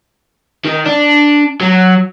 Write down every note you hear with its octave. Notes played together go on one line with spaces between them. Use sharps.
D#3
D4
F#3